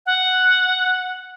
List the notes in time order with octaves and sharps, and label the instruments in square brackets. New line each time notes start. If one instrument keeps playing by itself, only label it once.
[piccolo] F#5